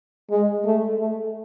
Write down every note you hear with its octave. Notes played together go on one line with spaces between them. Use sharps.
G#3
A3
A3